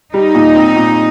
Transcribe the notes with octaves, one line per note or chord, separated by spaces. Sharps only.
G3 D#4
A#2
C4
A#2